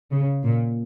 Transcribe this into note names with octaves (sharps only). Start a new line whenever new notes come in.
C#3
A#2